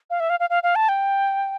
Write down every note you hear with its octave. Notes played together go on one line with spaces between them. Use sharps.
F5
E5
F5
F5
F5
F5
A5
G5